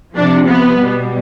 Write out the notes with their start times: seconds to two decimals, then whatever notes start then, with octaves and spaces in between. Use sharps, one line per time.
0.15 C3 F3 D4
0.46 B3
0.78 B2 G3